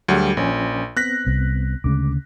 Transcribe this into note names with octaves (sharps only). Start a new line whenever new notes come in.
D2 F#3 G3 F#4 G#4
A#1 F3 C#4 G#5
B3 C4 F#6 A#6 B6
C2
D2 C#3 G#3 D6